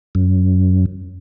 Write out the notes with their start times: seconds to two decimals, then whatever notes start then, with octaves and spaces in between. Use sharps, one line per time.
0.15 F#2